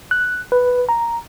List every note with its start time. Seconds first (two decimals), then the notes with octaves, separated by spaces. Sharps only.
0.11 F#6
0.52 B4
0.89 A#5